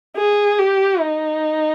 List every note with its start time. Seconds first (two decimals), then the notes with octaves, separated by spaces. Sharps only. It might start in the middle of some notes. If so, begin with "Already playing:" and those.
0.17 G#4
0.59 G4
1.01 D#4